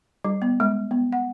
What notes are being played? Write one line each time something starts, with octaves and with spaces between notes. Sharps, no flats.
G3
B3
G#3
B3
F#5